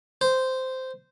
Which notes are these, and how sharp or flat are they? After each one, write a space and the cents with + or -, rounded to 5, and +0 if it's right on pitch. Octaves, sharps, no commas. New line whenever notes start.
C5 -10